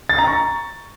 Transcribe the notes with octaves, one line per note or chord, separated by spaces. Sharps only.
A6
A#5
C#6